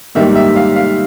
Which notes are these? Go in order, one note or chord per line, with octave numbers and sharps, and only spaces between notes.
G#2 D#3 G3 A#3 E5
E5
F5
F5